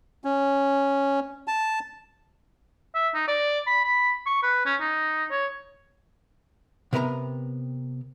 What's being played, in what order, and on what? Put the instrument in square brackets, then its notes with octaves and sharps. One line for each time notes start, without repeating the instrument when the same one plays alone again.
[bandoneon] C#4
A5
[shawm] E5
D#4
D5
B5
B5
C#6
B4
C#4
D#4
C#5
[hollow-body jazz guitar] C3 B3 A#4 C#5 A#5